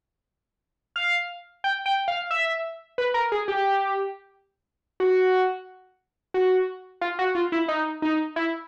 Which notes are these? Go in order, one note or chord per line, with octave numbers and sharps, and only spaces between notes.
F5
G5
G5
F5
E5
B4
A#4
G#4
G4
F#4
F#4
F4
F#4
F4
E4
D#4
D#4
E4